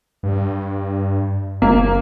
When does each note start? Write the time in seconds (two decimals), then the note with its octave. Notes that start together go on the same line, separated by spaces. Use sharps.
0.23 G2
1.62 F#1 A#3